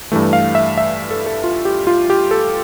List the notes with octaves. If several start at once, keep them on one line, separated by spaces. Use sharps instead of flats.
G2 E3 A3
F5
E5
E5
A4
A4
F4
G4
F4
G4
A4